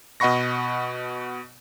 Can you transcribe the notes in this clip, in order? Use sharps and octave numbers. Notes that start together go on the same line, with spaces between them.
B2 D#5 F#5 B5 C#6 A#6